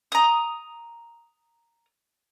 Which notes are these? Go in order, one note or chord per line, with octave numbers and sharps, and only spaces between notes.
A#5 D#6